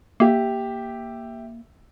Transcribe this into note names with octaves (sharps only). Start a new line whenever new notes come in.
A#3 G4 E5